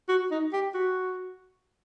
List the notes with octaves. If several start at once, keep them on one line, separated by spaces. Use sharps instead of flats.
F#4
D#4
G4
F#4